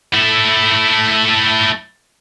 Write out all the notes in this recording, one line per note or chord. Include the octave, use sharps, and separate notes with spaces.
A3 E4